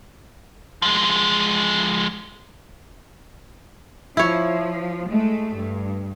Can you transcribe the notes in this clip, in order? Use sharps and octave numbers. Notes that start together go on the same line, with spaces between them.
F3 G#3
F3 E4 C#5
G#3 A3
G2